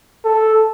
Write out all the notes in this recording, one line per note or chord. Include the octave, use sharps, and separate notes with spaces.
A4